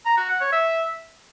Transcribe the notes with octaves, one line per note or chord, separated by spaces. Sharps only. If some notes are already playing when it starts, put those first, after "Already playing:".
A#5
F#4
F#5
C#5
E5